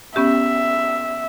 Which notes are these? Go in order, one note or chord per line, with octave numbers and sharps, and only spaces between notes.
B3 C#4 G4 E5